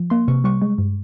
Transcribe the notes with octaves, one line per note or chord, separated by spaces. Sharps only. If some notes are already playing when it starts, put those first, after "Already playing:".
Already playing: F3
A#3 C6
C3 C#6
G3 C#6
G#3
G2